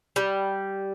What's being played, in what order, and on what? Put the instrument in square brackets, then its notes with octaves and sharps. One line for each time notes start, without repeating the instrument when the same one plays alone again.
[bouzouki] G3